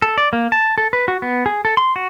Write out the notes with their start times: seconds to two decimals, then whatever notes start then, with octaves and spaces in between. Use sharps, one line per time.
0.02 A4
0.18 D5
0.33 A#3
0.52 A5
0.78 A4
0.93 B4
1.08 F#4
1.22 B3
1.46 G#4
1.65 A4
1.77 C6
1.96 F#4